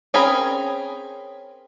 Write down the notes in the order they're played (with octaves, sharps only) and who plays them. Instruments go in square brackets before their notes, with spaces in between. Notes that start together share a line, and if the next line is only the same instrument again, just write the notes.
[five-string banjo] C4 C#4 G#4 A#4 B5